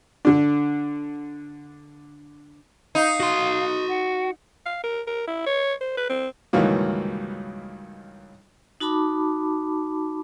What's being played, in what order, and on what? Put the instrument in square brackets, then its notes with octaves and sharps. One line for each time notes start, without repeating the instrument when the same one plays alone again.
[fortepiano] D3 D4
[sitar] D#4 [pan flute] F5
[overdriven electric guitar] F#4 C6
[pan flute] F#5
[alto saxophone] F5
A#4
A#4
E4
C#5
C5
B4
C4
[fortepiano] C#2 G2 D#3 E3 F#3 A#3
[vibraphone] D#4 F#4 A5 B5 D6